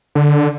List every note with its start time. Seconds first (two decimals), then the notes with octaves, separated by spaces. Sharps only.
0.15 D3